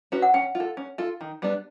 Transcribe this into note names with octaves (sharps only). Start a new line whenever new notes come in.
C#4 F#4 B4
F#5
C#4 G5
F4
A4
C#4
F4 A4
D#3
G3 B3 D4